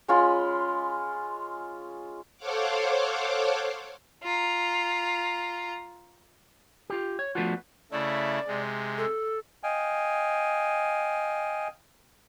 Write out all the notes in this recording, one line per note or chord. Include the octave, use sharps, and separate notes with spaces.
G#3 C#4 F4 B5
A4 C5 C#5 F5 F#5 D6
F4 A#5
F4 G4
C#5
F3 A3 B3 D4 F4 F#4
C#3 A3 E4 D5
C3 G#3
A4
D#5 F5 G5 G#5